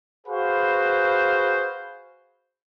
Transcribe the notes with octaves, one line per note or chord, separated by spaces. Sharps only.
F#4 G#4 B4 C5 F5